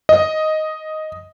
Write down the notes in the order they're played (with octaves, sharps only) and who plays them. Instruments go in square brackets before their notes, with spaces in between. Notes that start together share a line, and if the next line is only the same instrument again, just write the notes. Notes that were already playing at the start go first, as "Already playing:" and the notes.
[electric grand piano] D#5